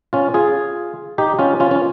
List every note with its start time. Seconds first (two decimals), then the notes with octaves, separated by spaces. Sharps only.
0.13 C#4 F4
0.34 F4 G#4
1.18 D#4 G4
1.39 C#4 F4
1.60 C#4 F4
1.71 C#4